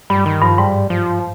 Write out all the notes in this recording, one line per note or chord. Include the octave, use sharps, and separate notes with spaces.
G2 G3
D#3
G2 F3
G#2 G3
F3